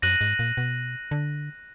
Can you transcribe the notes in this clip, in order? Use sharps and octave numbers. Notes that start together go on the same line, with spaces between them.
F#2 F#6 A#6 D#7 F#7
G#2
A#2
B2
D3